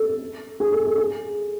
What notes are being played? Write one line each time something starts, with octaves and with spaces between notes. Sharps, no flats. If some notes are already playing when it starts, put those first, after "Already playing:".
Already playing: A4
G#4
A4
A4
G#4